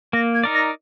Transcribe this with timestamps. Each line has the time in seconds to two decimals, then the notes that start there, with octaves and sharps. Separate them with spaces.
0.13 A#3 A#6
0.34 G#6
0.44 D#4 A#4 D5
0.54 A#6